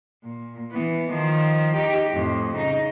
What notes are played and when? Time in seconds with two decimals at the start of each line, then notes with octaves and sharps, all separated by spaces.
0.24 A#2
0.72 E3 B3
1.10 D#3 F3
1.75 D#4 G4
2.11 F2 A2
2.54 C#3 D#4